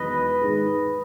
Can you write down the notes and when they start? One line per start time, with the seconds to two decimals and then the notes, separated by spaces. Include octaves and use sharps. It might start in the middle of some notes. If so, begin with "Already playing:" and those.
Already playing: E1 E2 D#3 F#3 B4 D#5
0.42 G#2 D#3 G#3 D#4 G#4